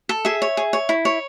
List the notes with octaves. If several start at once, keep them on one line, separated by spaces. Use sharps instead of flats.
A4
G#4 E5
C#5
G#4
C#5
E4
C#5